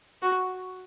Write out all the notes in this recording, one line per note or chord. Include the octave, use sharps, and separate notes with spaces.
F#4